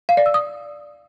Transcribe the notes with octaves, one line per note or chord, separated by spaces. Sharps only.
F5
D5
E6
D#6